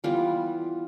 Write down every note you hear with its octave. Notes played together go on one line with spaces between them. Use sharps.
E3 G3 B3 F4